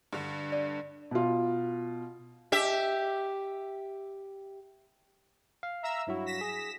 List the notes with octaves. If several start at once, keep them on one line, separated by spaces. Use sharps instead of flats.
G2 D3
D5 A5
B2 F4
G4 E5
F5
E5 A#5 E6
G2 F#3 E4 F#4
A#6 B6 E7
G#4